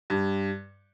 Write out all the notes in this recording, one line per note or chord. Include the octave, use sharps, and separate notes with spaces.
G2